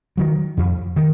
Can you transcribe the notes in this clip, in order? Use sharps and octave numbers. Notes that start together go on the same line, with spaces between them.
D#3 F#3
F2
D#3